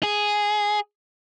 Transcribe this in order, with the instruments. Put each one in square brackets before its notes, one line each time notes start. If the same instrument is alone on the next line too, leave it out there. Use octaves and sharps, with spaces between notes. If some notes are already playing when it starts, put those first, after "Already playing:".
[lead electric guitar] G#4